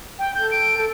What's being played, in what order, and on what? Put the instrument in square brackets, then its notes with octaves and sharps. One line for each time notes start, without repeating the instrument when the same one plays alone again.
[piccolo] G5
[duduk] A4 [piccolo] G6
[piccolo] D7
[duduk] A4